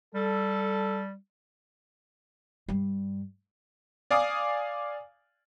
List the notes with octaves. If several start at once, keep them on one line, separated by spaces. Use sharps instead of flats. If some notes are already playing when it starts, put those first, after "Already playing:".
G3 A4
G2 G3
D5 F5 G#5 D6 D#6